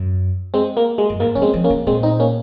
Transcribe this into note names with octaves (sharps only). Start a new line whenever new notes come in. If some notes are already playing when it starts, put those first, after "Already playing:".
Already playing: F#2
G#3 C4
A#3
G#3
F#2
G#2 A#3
F#3 C#4
G#3 C4
F3
A#3 C#4
C#3
A#2 G#3 C4
C4 D#4
A#3 C#4